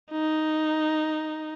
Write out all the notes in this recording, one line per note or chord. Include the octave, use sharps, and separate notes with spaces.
D#4